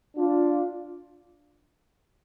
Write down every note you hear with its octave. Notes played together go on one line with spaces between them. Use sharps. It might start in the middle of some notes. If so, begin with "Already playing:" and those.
D4 F4